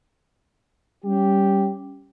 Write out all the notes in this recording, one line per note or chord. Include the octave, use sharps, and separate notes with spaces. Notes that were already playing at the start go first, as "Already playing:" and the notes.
G3 C#4 G4